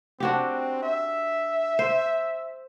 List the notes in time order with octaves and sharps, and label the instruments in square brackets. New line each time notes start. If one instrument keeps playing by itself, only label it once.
[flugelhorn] C4 [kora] D4 F#4 G4
[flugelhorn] E5
[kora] C5